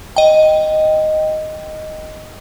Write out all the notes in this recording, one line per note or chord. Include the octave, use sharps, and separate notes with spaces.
D#5 G5